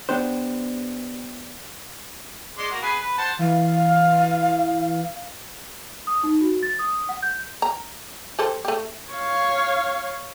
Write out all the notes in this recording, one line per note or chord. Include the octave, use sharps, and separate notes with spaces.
B3 D4 G4 C5
G#3 D5 C6
A#3 F#4
B3 G#4 B4
B4
C5 F#5 A5
E3 F5
D#6
D#4
F#4
A6
D#6
F#5
G6
A#5
G4 A4 C5
A3 G4
C#5 F5